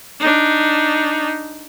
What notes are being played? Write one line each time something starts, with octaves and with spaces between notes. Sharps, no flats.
D4 D#4